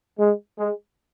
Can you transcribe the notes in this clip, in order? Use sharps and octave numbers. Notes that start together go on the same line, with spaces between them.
G#3
G#3